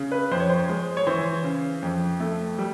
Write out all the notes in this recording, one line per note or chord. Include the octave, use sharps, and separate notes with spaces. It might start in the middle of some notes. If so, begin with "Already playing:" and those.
Already playing: C#3
B4
F2 C5
C#5
C5
G#3
C#5
E3 C5
C#3
F2
A3
G3